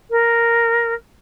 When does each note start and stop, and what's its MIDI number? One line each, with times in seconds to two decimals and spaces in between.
0.10 0.94 70